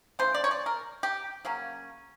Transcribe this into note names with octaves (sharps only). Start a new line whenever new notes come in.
C#3 E3 A3 C5
D5
C#5
D5
A#4
G4
C#3 F#3 A#3 C#4